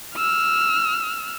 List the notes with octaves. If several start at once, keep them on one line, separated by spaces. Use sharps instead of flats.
E6 F6